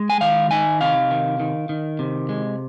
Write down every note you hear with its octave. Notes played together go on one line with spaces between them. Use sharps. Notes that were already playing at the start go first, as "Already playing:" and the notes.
Already playing: G#3
G#5
D#3 F5
D#4 G#5
C3 F5
D#3
D#3
D#3
C3
G#3